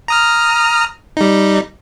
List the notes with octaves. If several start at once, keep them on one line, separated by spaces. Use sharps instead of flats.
A#5 D#6 F6
G3 D#4